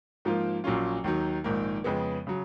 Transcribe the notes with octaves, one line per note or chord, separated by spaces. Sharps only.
G#2 F3 A#3 F4
A#1 A#2 F#3 C#4 F4
D#2 D#3 F#3
A#1 G#2 D#3 A#3
F2 C#3 G#3 B3
C#3 F#3